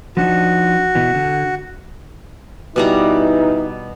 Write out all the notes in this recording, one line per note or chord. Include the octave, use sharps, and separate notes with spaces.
F3 D4 D#4 F#4
B2 E3
D3
B2 E3 G3 D#4 A#5